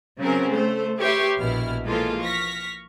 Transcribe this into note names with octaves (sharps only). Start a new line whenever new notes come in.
C#3 F#3 C4 C#4 A#4
A3 C5
G4 B4 C#5 E5 C6 C#6
A#1 B2 E4 F6
E3 F3 G#3 A#3 F4 A4
C#6 F6 A#6 B6